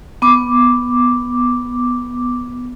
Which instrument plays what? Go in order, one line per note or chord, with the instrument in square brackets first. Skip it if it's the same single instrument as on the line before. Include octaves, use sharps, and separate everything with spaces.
[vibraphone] B3 D6